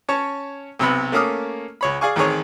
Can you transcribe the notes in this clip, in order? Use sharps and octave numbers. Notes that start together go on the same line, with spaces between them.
C#4 C#5 A5
B1 C3 B3 B5
A3 A#3 C#4 D6 D#6 F6
C#2 C#5 B5
G#4 D5 F5 G#5 C#6
A1 D#3 C4 G#4 C#5